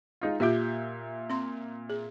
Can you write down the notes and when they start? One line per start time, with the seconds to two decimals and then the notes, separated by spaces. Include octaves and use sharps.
0.21 G#3 D#4 F4
0.40 A#2 F4 G4 E5 G6
1.30 C4 C6
1.90 G#4